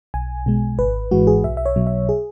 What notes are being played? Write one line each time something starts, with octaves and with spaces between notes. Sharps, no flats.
B1 G#5
B2 G#3
G#1 B4
G#2 E3 G#3 F#4
G#4
B1 E5
E5
C#5
B2 F#3
E5
G#4